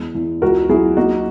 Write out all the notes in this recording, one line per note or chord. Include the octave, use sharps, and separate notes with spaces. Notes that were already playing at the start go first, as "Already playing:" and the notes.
Already playing: E2 G#3
E2
C#2 F#4 A#4
F#3 E4 G#4
A#3 D#4 F#4